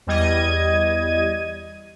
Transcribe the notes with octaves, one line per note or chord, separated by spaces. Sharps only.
E2 G3 D#5 G#6 D#7